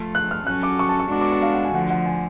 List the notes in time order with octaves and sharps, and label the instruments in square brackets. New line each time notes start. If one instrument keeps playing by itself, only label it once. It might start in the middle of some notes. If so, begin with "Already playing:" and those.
Already playing: [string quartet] F3 A3 F4 A4
[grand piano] F#6
F6
[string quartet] F#3 C#4 F#4 A4 [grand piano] F#6
[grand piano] D6
C#6
A5
C#6
[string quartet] G#3 B3 D4 F#4 A4 [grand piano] D6
[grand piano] D6
D6
F5
F#5
G#5
[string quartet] D3 F3 A3 [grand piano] F#5
[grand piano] F#5
G#5